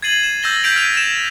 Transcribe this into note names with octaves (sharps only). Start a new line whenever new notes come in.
G#6 A6 C7 D#7 F#7
E7
E6 G6 A6 A#6 E7 G7
G6 B6 D7 F7
F6 G6 B6 D7 D#7 F7
E7